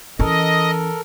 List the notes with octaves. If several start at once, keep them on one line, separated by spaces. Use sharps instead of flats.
E3 C#4 A4 A#4 D#5